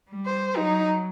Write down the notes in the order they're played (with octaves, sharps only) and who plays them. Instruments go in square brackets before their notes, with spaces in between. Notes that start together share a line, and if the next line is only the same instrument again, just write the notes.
[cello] G3
[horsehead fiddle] C5
[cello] F#3 [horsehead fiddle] D#4